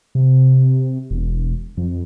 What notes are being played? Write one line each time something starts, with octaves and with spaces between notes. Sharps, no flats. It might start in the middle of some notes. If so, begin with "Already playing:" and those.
C3
E1
F2